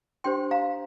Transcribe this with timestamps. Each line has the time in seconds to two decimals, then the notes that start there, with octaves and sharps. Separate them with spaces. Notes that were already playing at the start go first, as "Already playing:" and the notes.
0.24 D4 G4 C5 G5 C6
0.51 F5 A#5